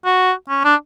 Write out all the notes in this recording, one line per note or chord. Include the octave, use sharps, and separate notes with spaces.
F#4
C#4
D4